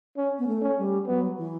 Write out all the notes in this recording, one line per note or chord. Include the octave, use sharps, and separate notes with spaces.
C#4
B3
A3
C#4
G3
F#3 B3
E3